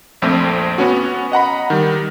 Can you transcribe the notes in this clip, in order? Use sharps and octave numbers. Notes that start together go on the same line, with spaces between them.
A#1 F2 A3 C4
B3 C#4 F#4
D#5 F#5 A#5 B5
D#3 G3